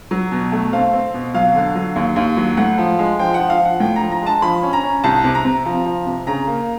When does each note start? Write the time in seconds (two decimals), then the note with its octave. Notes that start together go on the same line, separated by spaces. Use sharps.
0.11 F#3
0.32 B2
0.52 A3
0.73 C4 F5
0.93 C4
1.14 B2
1.34 F#3 F5
1.55 D3
1.75 F#3
1.96 D#2
2.16 D#2
2.37 F#3
2.57 A2 F#5
2.78 F3
2.99 G#3
3.19 F3 G5
3.34 F#5
3.39 F3
3.50 F5
3.60 F3
3.65 F#5
3.80 A2 G5
3.96 A#5
4.01 F3
4.12 A#5
4.22 G#3 A5
4.42 F3 B5
4.63 C#4
4.73 A#5
4.83 C#4
5.04 C2 A5
5.24 C3
5.35 A#5
5.45 C3
5.65 F3
5.86 F3
6.06 C3
6.27 C#3 A#5
6.47 A#3